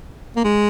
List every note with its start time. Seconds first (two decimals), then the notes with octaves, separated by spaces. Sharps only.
0.36 A#3
0.45 G#3